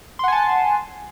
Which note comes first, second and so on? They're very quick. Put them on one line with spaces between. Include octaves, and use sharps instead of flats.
C6 F#5 G#5 A5